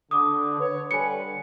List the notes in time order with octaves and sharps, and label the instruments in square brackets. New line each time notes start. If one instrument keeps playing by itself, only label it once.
[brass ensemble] D3 [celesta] D6 D#6
[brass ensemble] B4 C#5
[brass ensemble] D3 G3 B4 [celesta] G#5 C#7